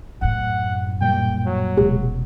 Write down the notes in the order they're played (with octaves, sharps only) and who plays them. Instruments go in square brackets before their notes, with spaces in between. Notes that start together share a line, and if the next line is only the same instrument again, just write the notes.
[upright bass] F#2 A2 [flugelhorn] F#5
[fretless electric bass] A#2 G3 [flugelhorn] G5
[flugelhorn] F#3
[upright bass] E1 C3 [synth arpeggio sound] G#3